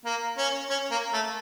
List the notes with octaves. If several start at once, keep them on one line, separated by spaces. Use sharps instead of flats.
A#3
C#4
C#4
A#3
A3